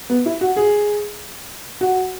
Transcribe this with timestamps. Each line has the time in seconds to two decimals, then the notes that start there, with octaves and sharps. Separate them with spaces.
0.10 B3
0.26 E4
0.41 F#4
0.56 G#4
1.81 F#4